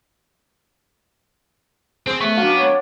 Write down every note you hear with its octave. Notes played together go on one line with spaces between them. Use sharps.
C4 G#4 C5
A3 B3 C#6
F#2 D4 F#4 F5
C#5